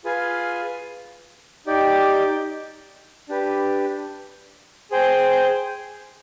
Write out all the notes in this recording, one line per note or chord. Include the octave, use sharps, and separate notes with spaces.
F4 G#4 B4 F5 G#5
D#4 G4 D5 G5
D4 G4 B4
G#4 C5 G5